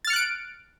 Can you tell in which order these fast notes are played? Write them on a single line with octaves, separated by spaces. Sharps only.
A6 F6 C#7 F#6 D7